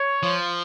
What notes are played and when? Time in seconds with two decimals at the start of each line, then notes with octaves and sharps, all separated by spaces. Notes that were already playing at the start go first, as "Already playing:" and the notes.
Already playing: C#5
0.23 F3